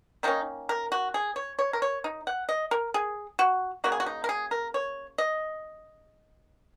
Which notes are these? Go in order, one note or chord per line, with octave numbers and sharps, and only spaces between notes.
D#3 A#3 C#4 D#4
A#4
F#4
G#4
C#5
C#5
A#4
C#5
D#4
F#5
D#5
A#4
G#4
F#4
C#3 F#3 A#3 F#4
G#4
F#4
D#4
A#4
G#4
A#4
C#5
D#5